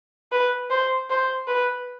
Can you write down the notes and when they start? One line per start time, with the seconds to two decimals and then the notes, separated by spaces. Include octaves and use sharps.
0.32 B4
0.70 C5
1.10 C5
1.47 B4